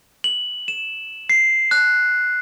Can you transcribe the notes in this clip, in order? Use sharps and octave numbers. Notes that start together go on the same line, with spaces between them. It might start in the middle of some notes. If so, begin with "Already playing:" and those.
F#7
E7
C7
F#6